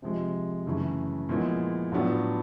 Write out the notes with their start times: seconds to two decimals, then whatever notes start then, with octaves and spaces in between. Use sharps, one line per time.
0.02 C3 F3 G#3
0.66 F#2 C#3 E3 A3
1.29 A#2 F3 G#3 B3 E4
1.92 A2 F#3 B3 D4 F4